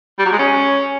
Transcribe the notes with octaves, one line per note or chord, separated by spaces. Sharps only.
G3
F#3
G#3
C#4